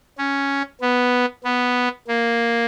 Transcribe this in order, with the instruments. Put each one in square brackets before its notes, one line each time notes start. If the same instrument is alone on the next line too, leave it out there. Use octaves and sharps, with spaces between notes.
[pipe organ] C#4
B3
B3
A#3